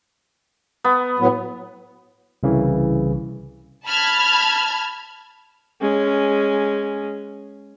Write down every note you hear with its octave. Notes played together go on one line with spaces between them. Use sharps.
B3
A2 F#3 B3
C2 C#3 E3
A5 B5 F6 G#6
G#3 C#4